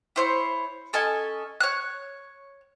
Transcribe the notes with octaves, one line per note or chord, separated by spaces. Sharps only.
E4 C5 C#5
C#4 A4 D#5 G#5
C#5 F#6